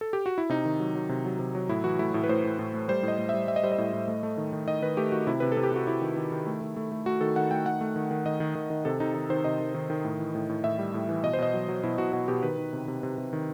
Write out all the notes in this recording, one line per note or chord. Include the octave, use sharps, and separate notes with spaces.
A4
G4
F#4
E4
C3 D#4
D#3
F#3
F#3
C3
F#3
C3
F#3
A2 E4
E3 F#4
A3 E4
A2 E4
B4
A2 C5
A2
A2
A3
G3 C5
A2
D#5
A2
G3 E5
G3 E5
D#5
G3 C5
D#5
A2
A2
A3
A3
D#3
D#3
D#3 D#5
D#3 B4
A3 G4
D#3 F#4
C3 E4
C3 B4
A4
C3
G4
C3 F#4
C3 E4
D#3
D#3
D#3
A3
D#3
A3
A3
A3 F#4
D#3 A4
D#3 F#5
A3 G5
D#3 F#5
A3
D#3
D#3
D#3 D#5
D#3
D#3
D#3
C3 A4
C3 D#4
D#3 D#4
D#3 C5
C3 D#5
D#3
D#3
D#3
A2
E3
A2
A2
A2 E5
G3
A2
E3
B2 D#5
C5
B2 D#5
F#3
F#3
B2 E4
B2 F#4
B2 F#4
B2 G4
D#3 B4
D#3
C3
C3
C3
C3
D#3